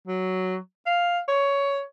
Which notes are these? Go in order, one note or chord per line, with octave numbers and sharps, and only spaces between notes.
F#3
F5
C#5